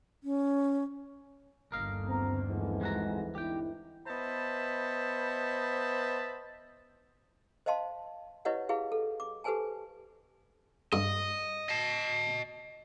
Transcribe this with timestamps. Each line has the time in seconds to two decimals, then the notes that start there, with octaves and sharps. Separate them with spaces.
0.23 C#4
1.72 G1 D#2 D3 A#4 D#5 F5
2.08 B3 C4 A#5
2.49 F2 G#2 E3
2.81 G#3 F#4 A#5
3.35 G1 D#4 E4 G4 G5
4.06 B3 C5 D#5 E5 A5 B5
7.66 C5 D#5 F5 A5 C6
8.45 E4 G4 B4 C#5 D#5 F#5
8.69 E4 G4 G#4 B4 F5
8.92 A4
9.20 D6
9.44 G4 A4 B4 C5 G#5 A5
10.93 G2 D#5
11.69 D#5 A5